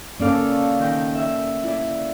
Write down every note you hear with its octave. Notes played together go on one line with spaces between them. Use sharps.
A#3 C#4 A4 D5 F5 D6
D#3 G5
E5 E6
E4 D5